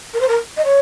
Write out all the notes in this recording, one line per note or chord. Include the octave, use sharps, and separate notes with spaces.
A#4
C5
A#4
D#5
C#5